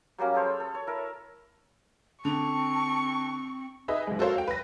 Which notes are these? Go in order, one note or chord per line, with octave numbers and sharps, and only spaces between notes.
F#3 G3 A#3 C#4
G#4 A4 C5 C#5
B5
A4
C#5
E4 A#4 A5
D3 C4 A5 C#6
D#4 G#4 B4 E5
F#1 G#3
F#4 A4 A#4 C5 C#5 F5
F5 G5
B4 A#6